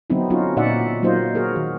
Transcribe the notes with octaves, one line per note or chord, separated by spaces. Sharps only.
D3 F#3 B3 C4 D#4 E4
F#3 C#4 D#4 F4 F#4
A#2 D#4 F#4 D5 E5 F#5
F#3 A#3 D#4 F4 C5 D#5
F#4 G#4 A#4
D#3